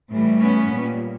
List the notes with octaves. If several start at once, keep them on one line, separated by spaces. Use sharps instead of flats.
A2 E3 G3
B3 C#4
A#2 G3